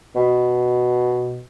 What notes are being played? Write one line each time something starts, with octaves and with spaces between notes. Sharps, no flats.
B2